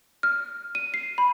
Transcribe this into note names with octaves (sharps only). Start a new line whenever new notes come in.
F6
D#7
C7
B5